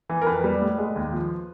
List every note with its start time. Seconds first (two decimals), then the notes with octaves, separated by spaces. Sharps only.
0.09 E3
0.22 A#4
0.27 F2 B4
0.44 G3
0.62 A2
0.78 G#3
0.96 D#2
1.13 F3